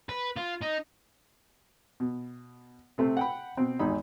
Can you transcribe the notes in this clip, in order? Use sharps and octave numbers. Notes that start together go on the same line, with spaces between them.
B4
F4
D#4
B2
C3 A3 C4
F#5 G5 B5
B2 C4
G#1 E2 D#4 B5